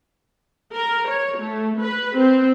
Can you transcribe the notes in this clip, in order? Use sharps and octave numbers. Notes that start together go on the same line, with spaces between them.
A#4
C#5
A3
B4
C4